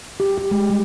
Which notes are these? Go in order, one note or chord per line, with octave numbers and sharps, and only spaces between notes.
G4
G4
G#3
G3